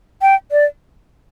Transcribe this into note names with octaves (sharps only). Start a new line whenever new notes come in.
G5
D5